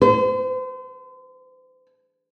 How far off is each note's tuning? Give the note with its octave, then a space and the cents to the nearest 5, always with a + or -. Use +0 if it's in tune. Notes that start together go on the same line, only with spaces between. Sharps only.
C5 -40